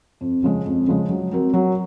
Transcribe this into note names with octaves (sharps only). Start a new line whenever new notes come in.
F2
C#3 F3 G#3
F2
C#3 F3 G#3
F#3
C4 F#4 A#4
F#3